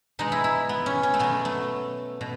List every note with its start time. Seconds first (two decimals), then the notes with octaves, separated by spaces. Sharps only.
0.19 B2 G#3 D#4
0.32 E4
0.44 E4
0.69 B3
0.86 C#4
1.03 C#4
1.14 A3
1.19 B2 F#3 B3
1.45 A3
2.21 B2